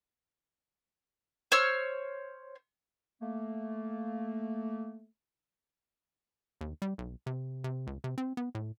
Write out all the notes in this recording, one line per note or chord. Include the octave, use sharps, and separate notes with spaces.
C5 C#5 E6 F6
A3 A#3
D#2
G3
B1
C3
C3
C#2
C3
C4
B3
A2